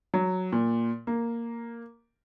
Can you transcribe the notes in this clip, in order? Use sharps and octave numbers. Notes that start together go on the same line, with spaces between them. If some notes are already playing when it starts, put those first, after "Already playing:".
F#3
A#2
A#3